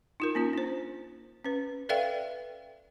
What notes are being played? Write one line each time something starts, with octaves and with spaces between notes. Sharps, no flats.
D#4 F4 A#4
A#3 C#4 F4
D4 C5
C#4 B4
A4 B4 D5 E5 F5 G5